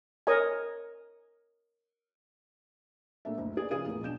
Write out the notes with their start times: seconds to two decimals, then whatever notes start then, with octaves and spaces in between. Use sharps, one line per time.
0.27 A#4 C#5 D#5 G#5
3.25 A#1 A3 A#3 D4 E5
3.38 F#1 D2
3.57 G#4 B4 D5
3.71 C#3 F3 G#4 B4 F5 D#7
3.86 E2 A2 A#3
4.01 B1 B2 D4 G6 E7